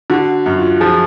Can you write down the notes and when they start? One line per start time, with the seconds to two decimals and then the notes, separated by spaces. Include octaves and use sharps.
0.10 D3 F#4
0.46 F#2
0.58 F4
0.80 F3 G#4